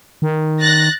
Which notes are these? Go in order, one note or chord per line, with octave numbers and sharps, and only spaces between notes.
D#3
F#6 A6 A#6